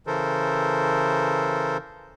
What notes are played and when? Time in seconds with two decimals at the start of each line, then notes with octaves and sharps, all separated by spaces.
0.07 C#3 E3 A4 A#4 C5